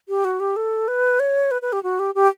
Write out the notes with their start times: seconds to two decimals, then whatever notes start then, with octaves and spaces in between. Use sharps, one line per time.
0.09 G4
0.25 F#4
0.40 G4
0.56 A4
0.88 B4
1.20 C#5
1.51 B4
1.62 B4
1.72 G4
1.83 F#4
1.99 G4
2.15 G4